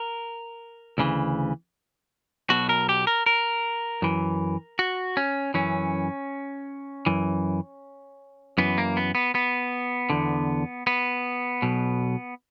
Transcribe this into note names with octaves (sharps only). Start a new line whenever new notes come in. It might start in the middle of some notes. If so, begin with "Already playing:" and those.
Already playing: A#4
D2 C#3 E3
B1 B2 F#4
A#4
G4
A#4
A#4
F#2 E3
F#4
C#4
F#2 E3 C#4
F#2 E3
F#2 E3 B3
A#3
B3
B3
B3
E2 D3
B3
B1 B2